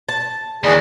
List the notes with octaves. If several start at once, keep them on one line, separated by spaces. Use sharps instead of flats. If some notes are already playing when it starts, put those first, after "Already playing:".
A5
D#2 E3 G#4 D5